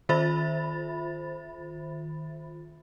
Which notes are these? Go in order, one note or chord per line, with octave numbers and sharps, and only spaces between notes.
D#3 F4 C5 E5 B5 A6